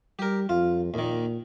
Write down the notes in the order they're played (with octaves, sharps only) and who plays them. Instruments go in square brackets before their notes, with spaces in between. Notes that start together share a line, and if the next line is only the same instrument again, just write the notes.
[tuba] G3 [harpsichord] G4 A#4
[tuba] F2 [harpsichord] F4
[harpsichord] D#2 D#3 [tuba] A#2